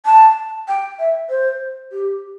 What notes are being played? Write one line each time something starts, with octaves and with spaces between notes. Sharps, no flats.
A5
G5
E5
C5
G4